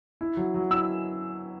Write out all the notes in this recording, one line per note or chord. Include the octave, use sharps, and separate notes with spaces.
E4
F#3
F#3
E4 E6